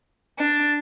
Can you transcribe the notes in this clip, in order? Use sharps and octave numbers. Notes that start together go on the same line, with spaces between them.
D4